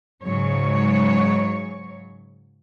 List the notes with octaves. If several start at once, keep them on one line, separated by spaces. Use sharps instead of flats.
G#2 C#3 F#3 C#5